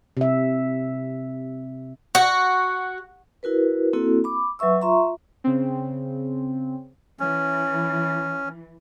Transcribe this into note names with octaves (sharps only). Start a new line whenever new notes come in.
C3 E5
F#4
E4 F#4 A#4 B4
A#3 C4 E4 F#4 A4
B5 D6
F#3 B4 E5 C#6 E6
F4 E5 A#5 C6 C#6
C#3 C4
E3 C#4